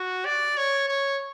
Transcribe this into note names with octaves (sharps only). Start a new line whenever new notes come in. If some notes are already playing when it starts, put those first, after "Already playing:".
Already playing: F#4
D5
C#5
C#5